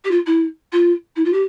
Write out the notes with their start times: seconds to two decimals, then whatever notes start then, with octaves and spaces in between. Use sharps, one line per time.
0.04 G4
0.11 F4
0.26 E4
0.72 F4
1.16 E4
1.24 F4
1.32 G4